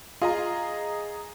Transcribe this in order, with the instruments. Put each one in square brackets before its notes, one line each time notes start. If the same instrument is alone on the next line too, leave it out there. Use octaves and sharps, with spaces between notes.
[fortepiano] F4 [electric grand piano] G#4 D#5 A#5